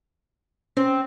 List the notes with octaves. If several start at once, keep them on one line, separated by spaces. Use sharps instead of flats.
C4 C#4